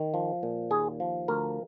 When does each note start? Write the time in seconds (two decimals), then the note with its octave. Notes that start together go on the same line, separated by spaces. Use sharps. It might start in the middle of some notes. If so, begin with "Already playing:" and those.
Already playing: D#3
0.14 F3
0.43 A#2
0.70 D#2 G#4
1.00 F3
1.28 D2 A#4